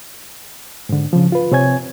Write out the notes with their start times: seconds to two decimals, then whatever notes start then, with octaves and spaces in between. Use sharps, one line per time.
0.89 G#2 D3
1.13 C#3 F3
1.32 F4 B4
1.52 C3 C4 C#5 G#5 G#6